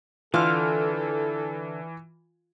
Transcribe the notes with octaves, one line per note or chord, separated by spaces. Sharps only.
D3 E3 F4 A4 F6